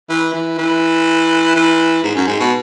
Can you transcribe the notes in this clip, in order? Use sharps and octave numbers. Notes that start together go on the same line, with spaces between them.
E3
E3
E3
E3
G#2
F#2
G#2
B2